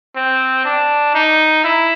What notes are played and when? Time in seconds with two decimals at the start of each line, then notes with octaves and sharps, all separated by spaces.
0.16 C4
0.65 D4
1.14 D#4
1.64 E4